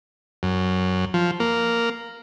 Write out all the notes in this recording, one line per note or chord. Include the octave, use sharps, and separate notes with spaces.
F#2
F3
A#3